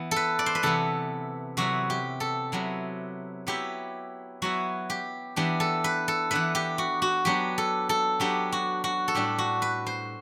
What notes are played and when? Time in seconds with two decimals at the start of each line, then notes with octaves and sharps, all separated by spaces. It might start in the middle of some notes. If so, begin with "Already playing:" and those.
Already playing: E3 B3 E4
0.11 A4
0.16 B4
0.39 D5
0.46 C5
0.55 B4
0.63 C3 E3 B3 E4 A4
1.57 C3 F#3 B3 E4 F#4
1.90 G4
2.20 A4
2.52 C3 F#3 B3 E4
3.47 F#3 B3 E4 G4
4.42 F#3 B3 E4 F#4
4.90 G4
5.36 E3 B3 D4 G4
5.60 A4
5.84 B4
6.08 A4
6.31 E3 B3 D4 B4
6.55 G4
6.78 F#4
7.02 F#4
7.25 F#3 B3 D4 G4
7.58 A4
7.89 A4
8.20 F#3 B3 D4 G4
8.52 F#4
8.84 F#4
9.08 A4
9.15 A2 G3 D4 G4
9.38 F#4
9.62 B4
9.86 C5